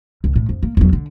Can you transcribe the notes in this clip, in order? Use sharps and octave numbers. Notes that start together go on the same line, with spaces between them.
C#2
A2
F2
A#3
E2 F#3
D3